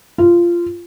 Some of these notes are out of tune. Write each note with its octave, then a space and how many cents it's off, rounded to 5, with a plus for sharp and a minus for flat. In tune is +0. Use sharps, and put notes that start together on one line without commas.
F4 -15